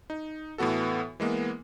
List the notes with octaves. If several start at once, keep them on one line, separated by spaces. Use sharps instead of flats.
D#4
A2 E3 B3 F#4 A4
E3 G#3 A#3 B3